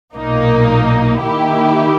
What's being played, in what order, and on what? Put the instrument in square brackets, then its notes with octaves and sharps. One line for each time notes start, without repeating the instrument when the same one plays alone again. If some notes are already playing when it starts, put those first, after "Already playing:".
[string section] B1 A#2 A#3 D#4
D#3 A#3 E4 G4